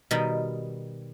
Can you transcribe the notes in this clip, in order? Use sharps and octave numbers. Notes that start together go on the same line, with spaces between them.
B2 D#3 G3 A#4 D#5 B5